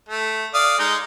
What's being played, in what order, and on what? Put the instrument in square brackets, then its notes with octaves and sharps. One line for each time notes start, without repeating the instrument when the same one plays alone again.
[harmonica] A3
D5 F5 D#6
G#3 D#4